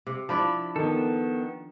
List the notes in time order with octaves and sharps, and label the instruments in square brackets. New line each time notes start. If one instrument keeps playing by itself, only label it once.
[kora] C3
[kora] F3 D4 E4 [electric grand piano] A5 B5
[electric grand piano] D#3 [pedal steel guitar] B3 A4